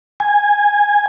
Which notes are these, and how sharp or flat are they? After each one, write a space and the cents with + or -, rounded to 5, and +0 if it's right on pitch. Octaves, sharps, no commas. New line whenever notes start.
G#5 -10